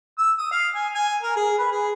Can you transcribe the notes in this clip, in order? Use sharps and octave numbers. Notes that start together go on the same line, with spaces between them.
E6
D#6
F5
G#5
G#5
A#4
G#4
B4
G#4